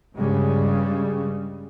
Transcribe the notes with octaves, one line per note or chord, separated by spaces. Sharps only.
G2 C#3 G3 G#3